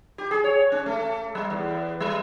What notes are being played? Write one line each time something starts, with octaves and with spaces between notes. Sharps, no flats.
G4
G#4
C#5
C#4
A3
G3
E2
G3